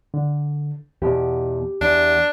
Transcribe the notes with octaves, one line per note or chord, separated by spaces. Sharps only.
D3
E2 B2 G4
E2 D4